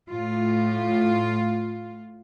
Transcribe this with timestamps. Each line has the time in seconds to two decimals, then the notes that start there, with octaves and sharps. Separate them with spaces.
0.10 A2 F4